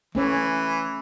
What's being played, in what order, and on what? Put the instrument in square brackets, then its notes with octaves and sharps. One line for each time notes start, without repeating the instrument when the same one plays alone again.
[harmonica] E3 [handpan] A3 C#4 C#5